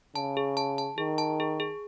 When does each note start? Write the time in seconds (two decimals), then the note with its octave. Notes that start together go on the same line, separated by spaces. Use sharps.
0.15 C#3 A5
0.37 G#4
0.57 A5
0.78 A5
0.98 D#3 G#4
1.18 A5
1.40 G#4
1.60 G#4